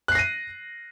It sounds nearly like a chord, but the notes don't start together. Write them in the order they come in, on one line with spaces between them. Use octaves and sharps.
F#6 C7 A#6 D#7